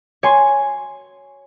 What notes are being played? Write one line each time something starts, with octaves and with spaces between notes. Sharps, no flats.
C#5 G#5 C6